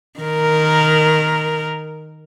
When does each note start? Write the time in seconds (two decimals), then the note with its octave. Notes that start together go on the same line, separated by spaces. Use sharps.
0.20 D#3 A#4